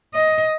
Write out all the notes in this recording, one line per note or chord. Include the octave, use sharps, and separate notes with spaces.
D#5